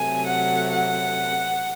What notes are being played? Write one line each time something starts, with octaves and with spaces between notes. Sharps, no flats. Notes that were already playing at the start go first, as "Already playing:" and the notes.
Already playing: C3 F#3 A3 G#5
F#5
F#5